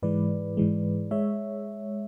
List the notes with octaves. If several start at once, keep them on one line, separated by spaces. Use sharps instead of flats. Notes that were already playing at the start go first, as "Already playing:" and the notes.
G#2 E3 G#3 B4 D5
G#2 E3 G#3
G#3 C#5 E5